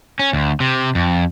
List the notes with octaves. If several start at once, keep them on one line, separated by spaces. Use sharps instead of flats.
C#4
D2
C3
F2